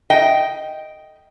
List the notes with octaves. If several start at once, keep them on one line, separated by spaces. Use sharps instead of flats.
D#5 G5